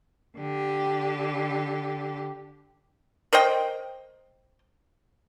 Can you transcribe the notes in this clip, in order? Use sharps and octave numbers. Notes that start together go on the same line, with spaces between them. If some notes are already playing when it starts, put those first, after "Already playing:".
D3 G4
A#4 C5 D#5 G5